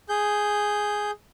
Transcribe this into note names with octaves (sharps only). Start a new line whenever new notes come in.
G#4 G6